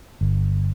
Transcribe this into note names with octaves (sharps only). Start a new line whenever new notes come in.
G1